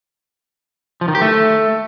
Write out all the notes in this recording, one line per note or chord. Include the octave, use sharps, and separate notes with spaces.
F3
D#3
G4
A3